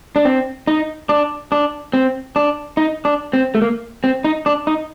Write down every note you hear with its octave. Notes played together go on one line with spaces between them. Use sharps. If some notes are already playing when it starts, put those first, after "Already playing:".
D4
C4
D#4
D4
D4
C4
D4
D#4
D4
C4
A3
A#3
C4
D#4
D4
D#4